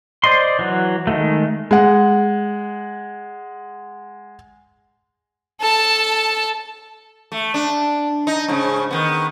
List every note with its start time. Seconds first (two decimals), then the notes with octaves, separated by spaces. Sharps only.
0.24 C5 D5 D#5 C6
0.59 E3 F#3
1.07 D#3 G#3 A3
1.71 G#3 F#5
5.61 A4 A5
7.32 A3
7.54 D4
8.27 D#4
8.48 G#2 C#3
8.91 D#3 B3